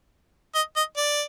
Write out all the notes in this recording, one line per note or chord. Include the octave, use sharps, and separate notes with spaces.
D#5
D#5
D5